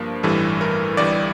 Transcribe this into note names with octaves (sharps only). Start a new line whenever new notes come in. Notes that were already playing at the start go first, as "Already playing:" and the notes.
Already playing: G2 F3 A#3 D4
A1 G2 E3 G3 A4
A#4
G1 G2 E3 G3 D5